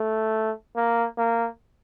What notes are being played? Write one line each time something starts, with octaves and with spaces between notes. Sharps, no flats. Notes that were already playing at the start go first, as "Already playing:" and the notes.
Already playing: A3
A#3
A#3